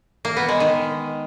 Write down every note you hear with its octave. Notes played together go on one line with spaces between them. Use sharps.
A#3
B3
G#3
D#3